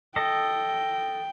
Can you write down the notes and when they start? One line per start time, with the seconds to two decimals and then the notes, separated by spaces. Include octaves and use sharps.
0.16 A4 D#5 G5